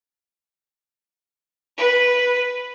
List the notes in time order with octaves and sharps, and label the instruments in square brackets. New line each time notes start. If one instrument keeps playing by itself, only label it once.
[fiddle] B4